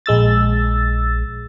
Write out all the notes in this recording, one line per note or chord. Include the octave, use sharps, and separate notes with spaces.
A#1 G#3 E6 A6